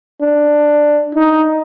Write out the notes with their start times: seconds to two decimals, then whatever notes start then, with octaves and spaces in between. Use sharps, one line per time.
0.21 D4
1.15 D#4